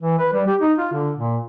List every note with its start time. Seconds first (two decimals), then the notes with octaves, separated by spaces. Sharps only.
0.01 E3
0.18 B4
0.33 G3
0.47 G4
0.61 D#4
0.78 F4
0.92 D3
1.17 A#2